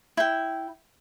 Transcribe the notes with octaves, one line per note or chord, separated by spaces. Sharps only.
E4 G5